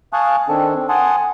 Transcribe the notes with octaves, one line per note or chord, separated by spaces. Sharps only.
F5 G#5 A5 C#6 D#6 F#6
D#3 C4 D4 A4
C4
F#5 G#5 A5 C6 D#6